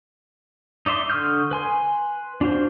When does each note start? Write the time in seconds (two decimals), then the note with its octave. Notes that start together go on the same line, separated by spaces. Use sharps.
0.86 D#4 D5 E5 C6
1.10 D3 C#6 D#6 F6 G6
1.51 B4 G#5 C6
2.41 D4 F4 F#4 C5